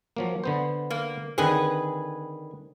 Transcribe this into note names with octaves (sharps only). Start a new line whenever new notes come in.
F3 F#3 A#3
D3 B3 C5
A#3
D3 D#3 C4 G#4 B4